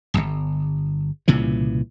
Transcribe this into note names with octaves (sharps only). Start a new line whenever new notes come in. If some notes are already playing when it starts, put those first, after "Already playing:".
D1 G1
C2 A#2 C#3 E3